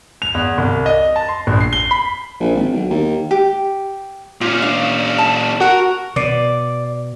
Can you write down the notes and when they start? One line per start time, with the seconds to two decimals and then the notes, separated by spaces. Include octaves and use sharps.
0.22 F7
0.35 E2
0.58 C2
0.86 D#5
1.16 A5
1.29 C6
1.47 A#1
1.61 C7
1.73 G7
1.91 B5
2.40 A#1
2.55 G#1
2.73 B1
2.90 D#2
3.31 G4
4.41 A#2 C#4 F4
4.61 D4 F5
5.18 A5
5.61 F#4 A#4
6.16 B2 D5